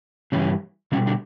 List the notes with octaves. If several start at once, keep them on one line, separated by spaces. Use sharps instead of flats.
G2 C#3 E3 G3 C#4
B2 C#3 G3 C#4
D3 D4